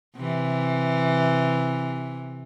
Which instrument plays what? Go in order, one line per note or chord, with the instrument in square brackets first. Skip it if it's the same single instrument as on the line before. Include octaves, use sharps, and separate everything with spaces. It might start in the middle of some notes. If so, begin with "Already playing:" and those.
[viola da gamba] C3 E3